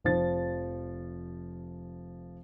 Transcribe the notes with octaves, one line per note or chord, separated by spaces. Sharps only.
F1 F3 A6